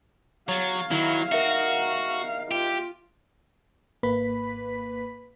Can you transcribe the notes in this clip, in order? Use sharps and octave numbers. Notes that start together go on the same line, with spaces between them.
F#3 C#5 F5 A6
D#3 F#3 E4
D#4 F#4 A#4 E5
F4 G4
G#1 A#3 B4 B5 B6